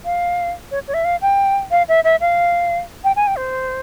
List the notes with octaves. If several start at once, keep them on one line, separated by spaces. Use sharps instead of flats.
F5
C#5
C#5
E5
F5
G5
F5
E5
E5
F5
G5
G#5
G5
C5